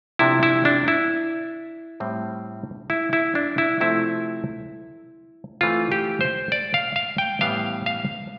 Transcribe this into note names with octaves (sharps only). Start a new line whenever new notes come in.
C3 F3 B3 D4 E4
E4
D4
E4
A2 G3 C4
E4
E4
D4
E4
C3 F3 A3 C4 E4
E3 A3 C4 F4
G4
C5
D5
F5
F5
G5
A2 E3 G3 B3 F5
F5